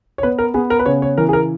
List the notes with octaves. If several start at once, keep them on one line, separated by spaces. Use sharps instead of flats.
C#5
B3 B4
A#4
B3 G#4
A#4
B4
C#3 C#5
C#5
E3 A#4
G#4
A#4